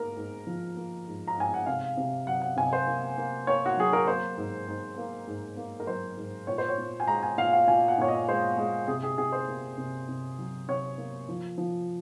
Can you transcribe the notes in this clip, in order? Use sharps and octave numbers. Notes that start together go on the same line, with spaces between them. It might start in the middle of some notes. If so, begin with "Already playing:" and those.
Already playing: G#2 A#3 A#4
G#2
F3
A#3
G#2
A#5
G#2 G#5
F#5
C3 F5
C3
F#3 F#5
F#5
C3 G#5
C5
A#3
A#3
A#3 C#5
F#4
F#3 G#4
A#4
A#3 C5
G#2
G#2
A#3
G#2
A#3
A#4
F#3 C5
G#2
A#2 C#5
C5
C#5
A#2
G#5
G#3 A#5
G#5
A#2 F5
F5
A#2 G#5
F#5
A#2 C#5
D#5
G#3 C5
G#3
C3 G#4
G#4
C3 G#4
C5
A#3
C3
C3
F#3
C3 C#5
A#3
F3
F3